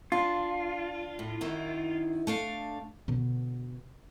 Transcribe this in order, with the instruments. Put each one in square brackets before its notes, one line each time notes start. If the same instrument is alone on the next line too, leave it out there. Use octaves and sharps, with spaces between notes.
[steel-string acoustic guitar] D4 [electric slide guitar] F4
[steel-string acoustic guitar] A2
F#2 D#3 E4
A3 D4 F5
[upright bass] B2 D3